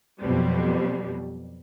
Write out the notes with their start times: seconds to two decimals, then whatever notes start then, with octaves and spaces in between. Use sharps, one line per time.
0.21 F2 B2 F#3 G3